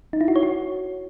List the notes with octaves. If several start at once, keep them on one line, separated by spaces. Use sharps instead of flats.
D#4
E4
F#4
C#5
F#4